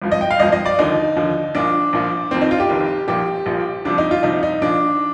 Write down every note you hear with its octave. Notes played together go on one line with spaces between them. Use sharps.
G#1 G2 F3
D#5
G5
F5
G#1 G2 F3 D#5
D#5
D5
D#2 D3 F3 D#4
D#2 D3 F3
A#1 A#2 F3 D4
A#1 A#2 F3
F1 F2 D#3 C4
D#4
F4
G4
F1 F2 D#3
A#1 A#2 F3 G4
A#1 A#2 F3
C2 C3 F3 D4
D#4
F4
C2 C3 F3 D#4
D#4
A#1 A#2 F3 D4